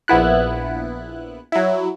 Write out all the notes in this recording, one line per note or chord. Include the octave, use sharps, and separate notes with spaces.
A#1 B3 E4 F#6
F#3 E4